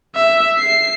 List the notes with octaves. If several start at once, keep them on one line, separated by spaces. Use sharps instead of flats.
E5
C7